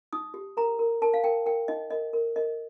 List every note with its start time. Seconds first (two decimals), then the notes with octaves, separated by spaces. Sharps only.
0.13 D#4 D#6
0.34 G4
0.57 A#4 A#5
0.79 A#4
1.02 A#4 A5
1.14 F5
1.24 A#4 G5
1.46 A#4 G5
1.68 D#4 D#5
1.90 A#4 D#5
2.13 A#4
2.36 A#4 D#5